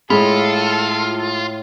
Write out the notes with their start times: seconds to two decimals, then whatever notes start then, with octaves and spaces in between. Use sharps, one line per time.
0.10 A2 G#3 F4 A4 B5